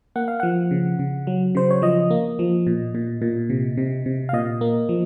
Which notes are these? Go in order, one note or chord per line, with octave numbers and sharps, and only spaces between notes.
A#3 F#5
F5
F3 F#5
C#3
C#3
F#3
C#3 C5
C#5
F3 D#5
A#3
F3
A#2
A#2
A#2
C3
C3
C3
F5
A#2 D#5
A#3
F3